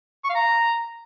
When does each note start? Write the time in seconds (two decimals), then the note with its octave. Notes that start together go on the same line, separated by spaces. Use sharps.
0.24 C#6
0.30 F5
0.35 A#5